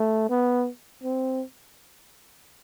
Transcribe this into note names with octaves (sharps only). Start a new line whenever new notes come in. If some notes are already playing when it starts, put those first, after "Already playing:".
Already playing: A3
B3
C4